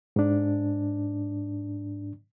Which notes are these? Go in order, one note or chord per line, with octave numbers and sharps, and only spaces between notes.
G#2 D4